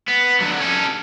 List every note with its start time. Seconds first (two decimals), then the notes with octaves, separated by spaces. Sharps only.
0.08 B3
0.40 D3 F#3
0.60 C#4 A4